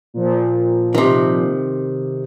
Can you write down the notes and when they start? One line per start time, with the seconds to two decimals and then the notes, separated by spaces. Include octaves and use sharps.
0.14 A#2 F3
0.95 C3 D#3